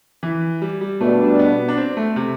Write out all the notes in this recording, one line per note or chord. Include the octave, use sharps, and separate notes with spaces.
E3
G3
G3
B2 G3 A3 D4
B3
D4
C4
A3
C3